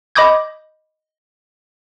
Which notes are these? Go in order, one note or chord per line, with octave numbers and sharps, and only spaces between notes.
D#5 B5 D6 D#6 G6 G#6